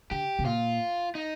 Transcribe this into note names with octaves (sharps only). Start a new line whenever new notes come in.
D3 G4
C3
A#2 F4
D#4